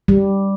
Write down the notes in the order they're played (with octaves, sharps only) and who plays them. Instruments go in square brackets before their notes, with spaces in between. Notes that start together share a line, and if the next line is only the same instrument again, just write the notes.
[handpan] G3